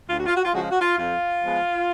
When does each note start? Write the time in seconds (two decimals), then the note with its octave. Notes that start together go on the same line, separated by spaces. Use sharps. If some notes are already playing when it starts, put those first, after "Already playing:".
0.09 D2 F4
0.18 F#4
0.26 F4
0.36 F#4
0.45 F4
0.53 C#3 F3 G#3 F#4
0.62 F4
0.71 F#4
0.80 F4
0.98 F2 F4
1.43 F3 G#3 B3